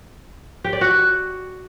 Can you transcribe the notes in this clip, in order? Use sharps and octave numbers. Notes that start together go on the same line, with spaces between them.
G4
D5
F#4